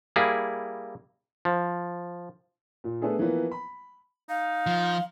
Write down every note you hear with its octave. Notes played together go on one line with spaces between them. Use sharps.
G3 A#3 E4 G#4
F3
A#2
A3 B3 D4 G#4 A4
E3 F3 A#3 B3
B5
D#4 F5
F3